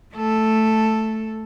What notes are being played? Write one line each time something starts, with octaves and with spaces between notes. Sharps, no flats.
A3 A4